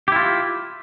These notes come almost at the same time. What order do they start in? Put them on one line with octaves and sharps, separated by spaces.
G4 E4 F4